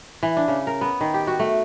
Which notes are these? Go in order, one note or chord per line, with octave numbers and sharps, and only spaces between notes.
E3
D4
C#3
A#4
B3
D#3
G4
F#4
A3